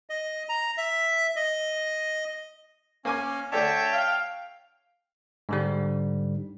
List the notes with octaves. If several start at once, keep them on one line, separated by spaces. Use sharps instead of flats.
D#5
A#5
E5
D#5
A#3 C#4 G#5 D6
D3 A3 D4 C#5 E5 G5 A5
F5
G#2 D3 G3